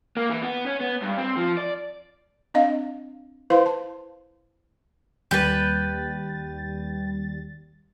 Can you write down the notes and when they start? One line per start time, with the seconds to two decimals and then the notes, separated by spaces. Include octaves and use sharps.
0.17 A#3
0.29 E3
0.42 B3
0.67 C#4
0.80 B3
1.02 G2
1.18 C4
1.37 F3
1.57 D5
2.54 C4 D4 D#5 F5
3.50 E4 B4 C5 F5 C6
3.66 A5
5.31 D#2 G3 G4 B4 A6